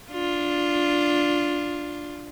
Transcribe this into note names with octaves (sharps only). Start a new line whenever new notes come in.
D4 F4